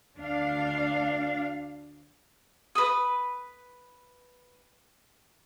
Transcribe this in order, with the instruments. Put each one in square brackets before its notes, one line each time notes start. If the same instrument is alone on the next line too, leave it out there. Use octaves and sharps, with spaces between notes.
[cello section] D2 D4 F5
[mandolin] B4 D#6